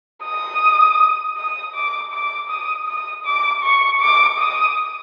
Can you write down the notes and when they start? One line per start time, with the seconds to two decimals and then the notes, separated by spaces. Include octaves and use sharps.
0.23 D#6
1.37 D#6
1.75 D6
2.13 D6
2.49 D#6
2.87 D#6
3.25 D6
3.63 C#6
4.00 D6
4.38 D#6